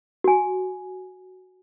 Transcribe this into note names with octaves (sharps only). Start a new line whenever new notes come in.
F#4 G#5